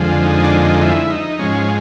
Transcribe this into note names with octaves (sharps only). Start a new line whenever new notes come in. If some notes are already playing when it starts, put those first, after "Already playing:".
Already playing: F2 D3 F3 G#3
D#4
D4
D#4
E4
D#4
G#2 F3 G#3 C#4